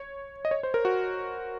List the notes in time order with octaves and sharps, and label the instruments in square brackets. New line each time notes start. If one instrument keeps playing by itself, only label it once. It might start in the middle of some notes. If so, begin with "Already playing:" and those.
Already playing: [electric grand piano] C#5
D#5
C#5
C5
A#4
F#4